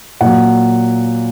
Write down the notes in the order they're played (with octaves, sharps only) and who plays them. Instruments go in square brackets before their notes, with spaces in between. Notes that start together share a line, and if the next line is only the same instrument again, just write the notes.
[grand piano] A#2 F#3 F#5